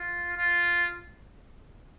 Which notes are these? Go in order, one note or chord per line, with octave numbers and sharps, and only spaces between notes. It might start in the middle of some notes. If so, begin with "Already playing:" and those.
Already playing: F4
F4